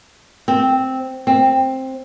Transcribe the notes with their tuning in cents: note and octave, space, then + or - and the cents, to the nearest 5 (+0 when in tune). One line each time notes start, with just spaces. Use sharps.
C4 +0
C4 +10